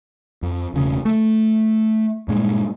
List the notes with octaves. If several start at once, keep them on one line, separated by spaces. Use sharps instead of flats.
F2
E1 C#3
A3
G2 A#2 G#3